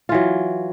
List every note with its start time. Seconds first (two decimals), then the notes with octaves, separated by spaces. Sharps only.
0.09 F4
0.12 E3
0.14 F#3